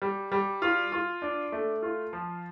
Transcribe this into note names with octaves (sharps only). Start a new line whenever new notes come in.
G3
G3
F4
F4
D4
A3
F4
F3